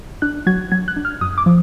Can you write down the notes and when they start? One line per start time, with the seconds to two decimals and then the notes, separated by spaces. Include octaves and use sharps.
0.22 D4 F#6
0.47 F#3 G#6
0.72 F#3 G#6
0.88 F#6
0.96 D4
1.05 F6
1.21 F#2 D#6
1.38 D6
1.46 F3